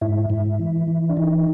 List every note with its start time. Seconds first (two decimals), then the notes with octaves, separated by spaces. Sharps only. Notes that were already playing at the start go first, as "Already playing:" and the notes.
0.01 G#2 E4
0.30 G#2
0.60 E3
0.87 E3
1.09 D4
1.17 E3 D#4